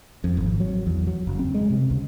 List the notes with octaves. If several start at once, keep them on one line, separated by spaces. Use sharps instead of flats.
F2
G#1
F#3
E2
F#3
F#1
C4
G#3
C3
C#2